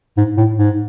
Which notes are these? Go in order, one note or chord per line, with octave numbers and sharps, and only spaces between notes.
G#2
A2
G#2